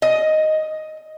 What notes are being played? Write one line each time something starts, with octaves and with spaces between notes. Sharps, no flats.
D#5